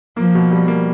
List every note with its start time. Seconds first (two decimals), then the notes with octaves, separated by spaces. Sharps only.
0.17 F3 A#3
0.35 B2
0.51 G3
0.68 A#3